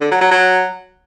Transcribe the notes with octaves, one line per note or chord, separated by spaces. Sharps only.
D3
F#3
F#3
F#3